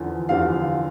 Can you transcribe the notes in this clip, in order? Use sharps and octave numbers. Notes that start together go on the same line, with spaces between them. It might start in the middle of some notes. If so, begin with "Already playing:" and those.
Already playing: E2 D3 F3
E2 D3 F3 F5